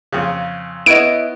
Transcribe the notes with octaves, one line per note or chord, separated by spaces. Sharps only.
F2 C#3
B3 E4 C#5 D#5 D7